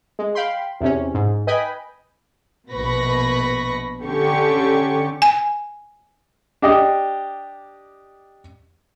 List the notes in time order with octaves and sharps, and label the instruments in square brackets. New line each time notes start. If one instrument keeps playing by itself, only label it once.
[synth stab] G#3
F5 G5 B5 C6
E2 C3 C#4
G#2
B4 D#5 G5 G#5 B5
[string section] A#1 B2 B4 B5 C#6 A#6
D3 C#4 G4 C#6
[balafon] G#5
[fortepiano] D4 G4 D#5